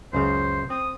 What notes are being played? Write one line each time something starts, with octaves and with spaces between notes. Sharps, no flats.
C#2 F#2 C#3 C5
C4 D#6